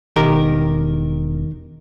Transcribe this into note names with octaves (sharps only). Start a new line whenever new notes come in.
E1 D#3 G4 A#4